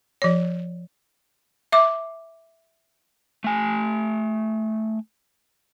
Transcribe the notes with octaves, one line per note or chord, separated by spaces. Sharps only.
F3 C#5
E5 D6
A3 G#5